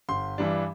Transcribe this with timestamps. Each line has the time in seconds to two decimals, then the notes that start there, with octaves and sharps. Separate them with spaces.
0.09 G1 C6
0.38 G2 E3 G3 D4